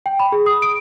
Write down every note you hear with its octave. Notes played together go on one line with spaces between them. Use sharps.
G5
B5
G#4
D#6
D7